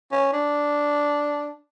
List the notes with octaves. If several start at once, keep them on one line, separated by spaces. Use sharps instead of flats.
C#4
D4